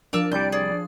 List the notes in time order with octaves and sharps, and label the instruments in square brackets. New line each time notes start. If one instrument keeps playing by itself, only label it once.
[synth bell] F3 D4 [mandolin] A#4 A5 E6
[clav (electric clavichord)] C2 G3 [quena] D5 [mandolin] G6
[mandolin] G#4 [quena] D5